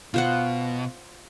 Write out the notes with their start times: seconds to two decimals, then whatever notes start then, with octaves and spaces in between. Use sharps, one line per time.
0.14 B2 F4 C5 F#5